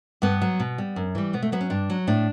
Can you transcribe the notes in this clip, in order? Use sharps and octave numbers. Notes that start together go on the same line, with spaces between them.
G2 B3
F#3
B2
G3
F#2
E3 G3
B2 B3
A3
F#3 B3
C#4
G2 D4
F#3
A2 D4